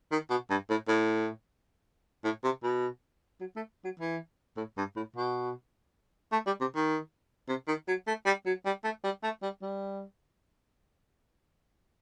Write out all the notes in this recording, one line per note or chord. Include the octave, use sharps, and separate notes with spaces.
D#3
B2
G2
A2
A2
A2
C3
B2
F#3
A3
F#3
E3
A2
G2
A2
B2
A3
G3
C3
D#3
C3
D#3
F#3
A3
G3
F#3
G3
A3
G3
A3
G3
G3